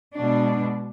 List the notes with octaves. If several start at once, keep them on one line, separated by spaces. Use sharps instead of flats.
B2 G#3 D4